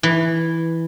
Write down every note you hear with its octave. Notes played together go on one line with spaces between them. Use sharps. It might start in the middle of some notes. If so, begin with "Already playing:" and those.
E3